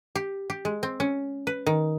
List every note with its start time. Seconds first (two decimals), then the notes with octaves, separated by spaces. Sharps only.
0.15 G4
0.50 G4
0.65 G#3
0.83 C4
1.00 C#4
1.47 B4
1.67 D#3